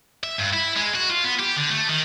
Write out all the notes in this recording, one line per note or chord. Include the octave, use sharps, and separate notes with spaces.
E5
G2
E4
G#3
F#4
F4
B3
G4
D3
A3
D#3